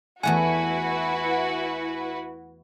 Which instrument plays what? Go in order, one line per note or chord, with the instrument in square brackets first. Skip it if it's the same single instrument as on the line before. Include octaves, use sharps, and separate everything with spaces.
[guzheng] E2 A3 F#5 [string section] E4 F#4 B4 [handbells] G#5